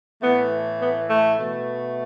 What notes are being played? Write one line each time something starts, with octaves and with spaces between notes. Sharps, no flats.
A2 E3 A3 B3
B3
A3
B2 A3